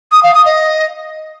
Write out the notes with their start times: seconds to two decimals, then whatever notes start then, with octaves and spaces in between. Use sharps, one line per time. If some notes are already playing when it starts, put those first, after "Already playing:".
0.11 D#6
0.23 F5
0.34 D#6
0.45 D#5